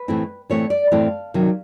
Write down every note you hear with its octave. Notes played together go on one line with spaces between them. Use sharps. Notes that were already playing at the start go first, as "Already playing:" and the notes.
Already playing: B4
A2 E3 A3 C4 E4
A2 E3 A3 C4 E4 C#5
D5
A2 E3 A3 C4 E4 F5
C3 D#3 F#3